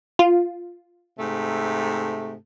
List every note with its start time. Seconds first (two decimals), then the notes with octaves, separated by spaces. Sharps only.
0.19 F4
1.19 G#2 C3 A3